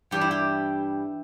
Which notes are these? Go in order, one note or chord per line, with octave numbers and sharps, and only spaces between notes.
G2 E3 G3 D4 G4
E4
G4